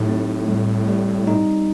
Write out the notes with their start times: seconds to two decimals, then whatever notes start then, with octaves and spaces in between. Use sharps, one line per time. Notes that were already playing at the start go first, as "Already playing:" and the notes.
Already playing: A2 F#3 D#4 G4
0.09 C4
0.48 G3
0.88 G3
1.28 D#4